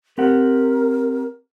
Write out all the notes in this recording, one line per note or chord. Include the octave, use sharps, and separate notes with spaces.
C4 G4 A#4 F#5